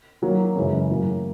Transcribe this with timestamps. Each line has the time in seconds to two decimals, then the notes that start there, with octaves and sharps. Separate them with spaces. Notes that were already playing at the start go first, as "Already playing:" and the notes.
0.22 D#3 F#3 A#3
0.55 F#2 C#3 E3 G#3 C#4
0.90 A2 F#3 A#3